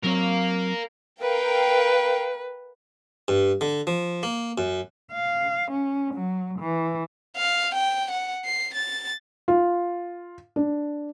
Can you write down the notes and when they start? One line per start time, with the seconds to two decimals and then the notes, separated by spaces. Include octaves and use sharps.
0.04 F#3 C4 A#4 C#5 F5
1.22 A#4 B4 F5 G5
3.28 G2
3.61 D3
3.87 F3
4.23 A#3
4.58 F#2
5.12 F5
5.71 C#4
6.15 F#3
6.59 E3
7.37 F5
7.75 G5
8.11 F#5
8.45 C7
8.75 A6
9.48 F4
10.56 D4